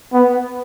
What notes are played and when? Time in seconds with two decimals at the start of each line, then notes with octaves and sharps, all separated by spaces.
0.13 B3